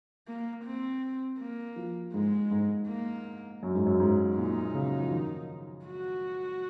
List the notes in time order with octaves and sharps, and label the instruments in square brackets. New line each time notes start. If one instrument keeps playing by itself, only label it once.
[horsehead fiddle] A#3
C4
A#3
[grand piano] F3
[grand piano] G#2 [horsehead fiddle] G#3
[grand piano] G#2
[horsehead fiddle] A#3
[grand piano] F#2
G#2
F#2
G#2
[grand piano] A#2 [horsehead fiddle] D#4
[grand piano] C#3
F3
D#3
[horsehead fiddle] F#4